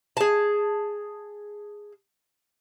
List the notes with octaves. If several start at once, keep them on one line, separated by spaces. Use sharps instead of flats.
G#4 A5